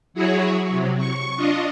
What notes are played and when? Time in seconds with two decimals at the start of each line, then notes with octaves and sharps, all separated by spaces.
0.14 F#3 E4 F#4 G#4 C#5
0.67 C3 F#3
0.97 C#6
1.36 D4 F4 D#5